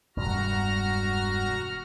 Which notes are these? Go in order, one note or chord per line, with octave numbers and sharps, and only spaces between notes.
E1 G2 G3 F#4 A#5 F6